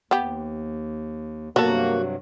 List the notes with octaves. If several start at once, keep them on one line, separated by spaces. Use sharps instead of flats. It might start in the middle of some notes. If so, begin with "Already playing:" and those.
D#2 B3 G4
G2 C3 F#3 A#3 B3 F#4 A4